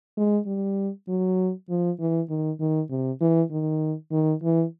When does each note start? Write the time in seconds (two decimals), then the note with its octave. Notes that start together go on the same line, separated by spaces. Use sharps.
0.17 G#3
0.47 G3
1.08 F#3
1.70 F3
1.99 E3
2.30 D#3
2.60 D#3
2.90 C3
3.21 E3
3.51 D#3
4.12 D#3
4.43 E3